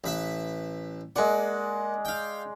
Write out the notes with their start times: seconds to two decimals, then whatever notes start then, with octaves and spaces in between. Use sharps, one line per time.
0.04 A1 B4 E5
1.16 G#3 A#3 D5 F#5
2.05 F5 G5